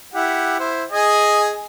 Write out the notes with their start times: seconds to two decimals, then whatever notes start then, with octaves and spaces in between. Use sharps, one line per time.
0.14 E4 G4 F#5
0.59 E4 C5
0.91 G#4 D#5 G#5